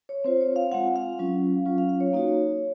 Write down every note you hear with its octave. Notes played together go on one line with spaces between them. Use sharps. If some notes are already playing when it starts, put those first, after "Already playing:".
C#5
C4 F4 C5
C#5
F5
G#3 C4 F4 F#5
F5
F#3 C#4 F4
F#3 C#4 F4
F5
F5
C#5
A#3 D#4 F#4